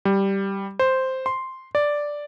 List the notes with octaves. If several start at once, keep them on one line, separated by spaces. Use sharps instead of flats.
G3
C5
C6
D5